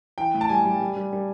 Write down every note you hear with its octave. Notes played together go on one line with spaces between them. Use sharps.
E3 G5
A2
A5
G3 G#5
G3
G3
G3
G3